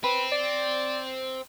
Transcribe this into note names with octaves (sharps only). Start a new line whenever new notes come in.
C4 B4
D5